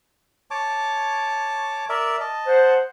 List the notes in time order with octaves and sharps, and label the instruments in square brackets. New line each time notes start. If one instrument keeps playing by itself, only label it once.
[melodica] C#5 A5 D6
A#4 D5 E5
D#5 A5
[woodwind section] C5 F#5